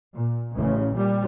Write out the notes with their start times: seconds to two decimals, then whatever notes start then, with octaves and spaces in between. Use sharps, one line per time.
0.15 A#2
0.55 A1 C#3
0.94 A#2 G3